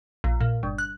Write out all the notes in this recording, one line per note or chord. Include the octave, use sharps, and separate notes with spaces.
A#1
A#2
G1
F#6